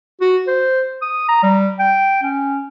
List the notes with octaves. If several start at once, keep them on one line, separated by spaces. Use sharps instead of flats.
F#4
C5
D#6
A#5
G3
G5
C#4